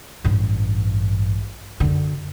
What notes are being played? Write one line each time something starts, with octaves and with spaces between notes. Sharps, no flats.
A1 G2
F#2 D3